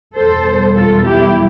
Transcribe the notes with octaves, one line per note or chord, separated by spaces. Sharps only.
E2 B2 G3 A4 C5
F4 A4
E4 G4